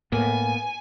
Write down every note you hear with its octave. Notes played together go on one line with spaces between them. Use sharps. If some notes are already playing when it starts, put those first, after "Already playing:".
A2 A#3 B3 G#5